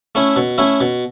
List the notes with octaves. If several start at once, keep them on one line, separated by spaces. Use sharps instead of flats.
A3 C#4 E4
B2
A3 C#4 E4
B2